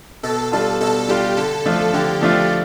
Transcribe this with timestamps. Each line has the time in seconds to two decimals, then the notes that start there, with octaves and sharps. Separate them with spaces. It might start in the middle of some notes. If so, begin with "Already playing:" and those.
0.23 B2 A4
0.52 G3 D4 F4 A4
0.81 B2 A4
1.08 G3 D4 F4 G4
1.37 D3 A4
1.66 F3 A3 D4 F4
1.94 D3 G4
2.21 F3 A3 D4 F4